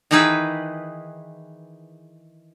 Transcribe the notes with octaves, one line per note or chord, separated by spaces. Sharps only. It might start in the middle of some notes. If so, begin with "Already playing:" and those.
D#3 E3 D#4 G#4 B4